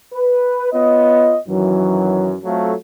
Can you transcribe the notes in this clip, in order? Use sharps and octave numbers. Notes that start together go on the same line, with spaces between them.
B4
B3 F4 C#5 D#5
F#2 D#3 E3 F#3
F#3 A3 C4 F4 A4 F5